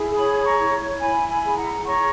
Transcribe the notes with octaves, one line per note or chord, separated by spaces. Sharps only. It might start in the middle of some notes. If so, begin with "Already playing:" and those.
Already playing: E4 G#4
C#5 B5 D#6
A#5 C#6
E4
E4 G#5 B5
G#5 B5
G#4
F#5 A#5
C#5 A#5 C#6